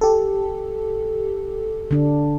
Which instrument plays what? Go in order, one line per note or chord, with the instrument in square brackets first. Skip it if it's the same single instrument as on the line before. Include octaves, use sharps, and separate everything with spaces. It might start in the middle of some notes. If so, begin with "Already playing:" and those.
[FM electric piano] G4 A4
[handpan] D3 D4